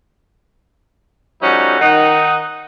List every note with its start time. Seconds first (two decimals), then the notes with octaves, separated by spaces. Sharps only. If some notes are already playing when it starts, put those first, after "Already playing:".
1.42 F3 G3 A3 C#4 D#4 F#4
1.81 D#3 D#4 F#5